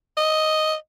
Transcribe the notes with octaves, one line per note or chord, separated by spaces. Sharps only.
D#5